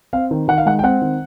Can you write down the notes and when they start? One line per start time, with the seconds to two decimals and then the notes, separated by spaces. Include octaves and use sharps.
0.13 C4 F5
0.31 D#3
0.48 D#3 F#5
0.58 F5
0.66 G#3 F#5
0.79 G5
0.83 C4 F#5
1.02 D#3